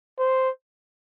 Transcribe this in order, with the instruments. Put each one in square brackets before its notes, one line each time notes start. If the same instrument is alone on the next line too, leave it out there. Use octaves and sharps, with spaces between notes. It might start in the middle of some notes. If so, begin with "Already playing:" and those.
[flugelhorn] C5